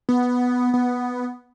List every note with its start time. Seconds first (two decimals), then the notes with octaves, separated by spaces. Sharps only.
0.09 B3
0.73 B3